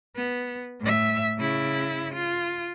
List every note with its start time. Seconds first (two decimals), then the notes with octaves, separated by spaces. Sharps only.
0.16 B3
0.81 A2 E5
1.38 C#3 E4
2.14 F4